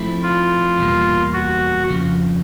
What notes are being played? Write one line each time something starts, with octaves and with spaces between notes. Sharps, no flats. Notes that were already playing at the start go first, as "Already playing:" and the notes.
Already playing: F3 A3 C4 E4
F4
E2 B2 G3 A#3
F#4
F2 C#3 F3